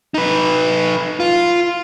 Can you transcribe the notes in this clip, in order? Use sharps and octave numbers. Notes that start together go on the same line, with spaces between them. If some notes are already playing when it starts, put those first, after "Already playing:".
D#4 B4
F4